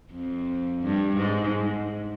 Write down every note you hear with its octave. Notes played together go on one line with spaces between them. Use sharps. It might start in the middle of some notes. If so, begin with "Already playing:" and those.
F2
G2
G#2